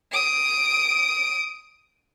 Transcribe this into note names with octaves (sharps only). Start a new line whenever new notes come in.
D#6 D7